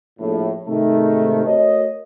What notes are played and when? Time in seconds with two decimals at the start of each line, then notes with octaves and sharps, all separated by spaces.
0.19 A#1 A2
0.68 G#2 C3 D#3 A3
1.47 A3 F#4 A#4 C#5 D#5